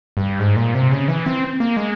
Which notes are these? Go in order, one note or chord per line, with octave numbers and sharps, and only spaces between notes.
G2
G#2
A#2
C3
C#3
E3
C4
A#3
G#3